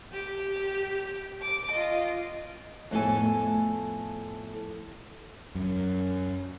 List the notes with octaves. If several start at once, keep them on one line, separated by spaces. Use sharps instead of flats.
G4
D6
F4 D#5
F2 A2 A3 B3 A4 G#5
F#2